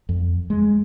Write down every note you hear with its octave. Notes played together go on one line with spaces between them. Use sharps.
F2
G#3